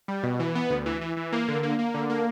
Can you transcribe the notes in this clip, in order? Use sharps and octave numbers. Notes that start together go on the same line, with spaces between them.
G3
B2
E3
B3
D2
E3
E3
E3
A#3
D3
A#3
A#3
D3
A#3